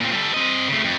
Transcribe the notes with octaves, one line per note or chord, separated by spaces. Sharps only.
A#2 C4
G3 A4
C4 D#5
C#3 A3
F2